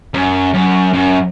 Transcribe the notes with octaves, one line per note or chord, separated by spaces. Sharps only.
F#2
F#2
F#2